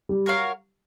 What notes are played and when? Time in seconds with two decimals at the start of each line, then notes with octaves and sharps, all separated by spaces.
0.09 G3
0.26 F#4 A#4 C#5 F5